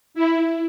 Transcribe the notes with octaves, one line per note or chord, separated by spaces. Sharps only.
E4